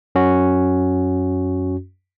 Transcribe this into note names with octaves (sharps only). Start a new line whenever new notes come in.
F#2 C#4 F#4